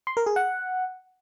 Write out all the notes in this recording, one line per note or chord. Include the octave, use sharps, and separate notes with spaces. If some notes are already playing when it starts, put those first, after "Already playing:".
C6
A#4
G#4
F#5